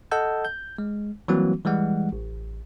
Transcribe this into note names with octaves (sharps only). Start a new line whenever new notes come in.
A4 D#5 F#5 A5 E6 G6
G6
G#3
E3 F#3 G3 A#3 C4 F#4
E3 G3 G#3 F#5
A1